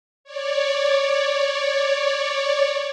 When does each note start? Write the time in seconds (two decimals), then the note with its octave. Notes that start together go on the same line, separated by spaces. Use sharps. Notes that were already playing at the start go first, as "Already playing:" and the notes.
0.24 C#5 D5